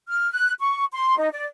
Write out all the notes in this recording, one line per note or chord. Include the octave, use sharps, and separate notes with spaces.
F6
F#6
C#6
C6
D#4
D5